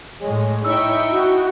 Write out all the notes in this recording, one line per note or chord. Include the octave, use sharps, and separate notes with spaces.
A2 G#3 C#5
D#4 E4 E5 G5 C#6 E6
F#4